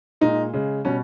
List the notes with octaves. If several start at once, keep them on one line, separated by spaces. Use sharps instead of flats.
A#2 G#3 D#4
C#3 G#3
B2 G3 C#4